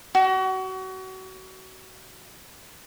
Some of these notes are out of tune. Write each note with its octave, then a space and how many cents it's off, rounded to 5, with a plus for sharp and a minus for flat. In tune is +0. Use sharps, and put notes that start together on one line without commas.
F#4 +30